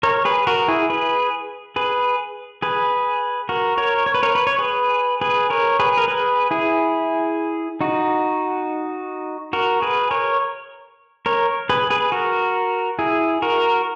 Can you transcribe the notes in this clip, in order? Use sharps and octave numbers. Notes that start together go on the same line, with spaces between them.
A#4 C#5
G#4 B4
F#4 A#4
E4 G#4
G#4 B4
G#4 B4
G#4 B4
F#4 A#4
A#4 C#5
C#5
B4
A#4 C#5
B4
C#5
G#4 B4
G#4 B4
A#4 C#5
G#4 B4
A#4
G#4 B4
E4 G#4
D#4 F#4
F#4 A#4
G#4 B4
A#4 C#5
A#4 C#5
G#4 B4
G#4 B4
F#4 A#4
E4 G#4
F#4 A#4